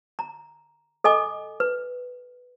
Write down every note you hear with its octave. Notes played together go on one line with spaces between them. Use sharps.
A#5
A4 D#5 G#5 D6
B4